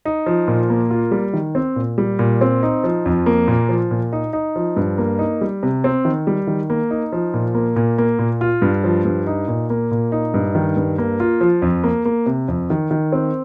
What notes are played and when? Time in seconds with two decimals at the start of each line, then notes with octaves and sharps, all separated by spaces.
0.05 D#4
0.26 F3
0.48 A#2
0.70 A#3
0.90 F4
1.11 G3
1.33 D#3
1.55 C4
1.76 A#2
1.98 G3
2.19 A#2
2.41 C4
2.63 D#4
2.84 F3
3.06 F2
3.26 A#3
3.48 A#2
3.69 F3
3.91 A#2
4.13 D#4
4.33 D#4
4.56 F3
4.77 G2
4.98 A#3
5.19 D#4
5.41 G3
5.63 C3
5.84 C4
6.05 D#3
6.27 G3
6.47 D#3
6.70 A#3
6.91 D#4
7.12 F3
7.34 A#2
7.55 A#3
7.76 A#2
7.98 A#3
8.19 A#2
8.41 F4
8.62 G2
8.84 F3
9.05 G2
9.27 D#4
9.48 A#2
9.70 A#3
9.91 A#2
10.12 D#4
10.34 G2
10.55 D#3
10.77 G2
10.98 A#3
11.20 F4
11.41 F3
11.62 F2
11.84 A#3
12.05 A#3
12.26 C3
12.48 F2
12.70 D#3
12.91 D#3
13.12 C4